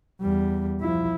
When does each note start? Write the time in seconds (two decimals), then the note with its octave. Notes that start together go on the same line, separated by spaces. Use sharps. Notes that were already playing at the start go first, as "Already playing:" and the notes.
0.21 E2 G3
0.81 F3 E4